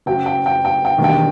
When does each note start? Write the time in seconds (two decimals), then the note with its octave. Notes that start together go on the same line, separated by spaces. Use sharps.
0.06 F#1 F#2 F#3 G5
0.26 G5
0.46 G5
0.65 G5
0.85 G5
0.98 E1 D#2 D#3 G3
1.04 G5